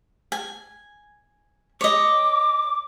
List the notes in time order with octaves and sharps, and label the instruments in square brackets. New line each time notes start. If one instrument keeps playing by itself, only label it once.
[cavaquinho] G#5
[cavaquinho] C#5 D#5 [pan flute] D6